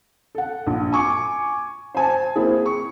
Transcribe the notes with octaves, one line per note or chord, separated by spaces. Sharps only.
A4 F#5
A#1
G#5 C#6 D6
C5 G#5 A5
A#3 C4 E4 G#4
C#6